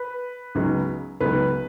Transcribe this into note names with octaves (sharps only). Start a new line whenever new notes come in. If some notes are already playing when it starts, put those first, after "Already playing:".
Already playing: B4
C#2 C#3 F#3 B3 D#4
C#2 C#3 F#3 B3 D#4 B4